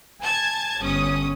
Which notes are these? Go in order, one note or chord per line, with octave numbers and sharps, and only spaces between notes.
G#5 A5 G#6
G1 C#4 D#6